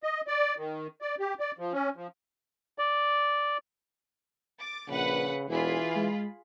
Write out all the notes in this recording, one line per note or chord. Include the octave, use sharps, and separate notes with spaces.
D#5
D5
D#3
D5
G4
D5
F3
C#4
F3
D5
D6 A6
A#1 C#3 B4 F#5
E1 E3 F4 G#4 B5
G#3